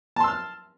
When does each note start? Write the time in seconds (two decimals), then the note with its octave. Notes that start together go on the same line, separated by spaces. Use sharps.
0.16 A5
0.20 C6
0.24 E6
0.28 F6